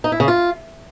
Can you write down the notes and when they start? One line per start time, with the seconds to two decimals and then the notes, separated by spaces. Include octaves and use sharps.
0.04 D#4
0.12 E4
0.20 C#3
0.28 F4